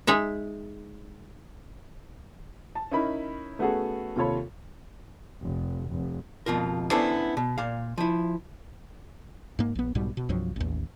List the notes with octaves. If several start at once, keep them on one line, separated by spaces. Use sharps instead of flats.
G#3 D#4 E5
A5
C#4 D#4 E4 A#4 B5
A3 B3 C#4 F#4 G#4 A4
D#2 C3 F4 A4 C#5 B5
F1
F1
F2 B2 F4 A#4
B3 C#4 D4 E4 A4 C5
B2
A#2 F5
F3 E4
G#2 A#3
A#1 B3
B1 G#2 B2 G3
B2
C2 G2 F3 F#3
A1 D#2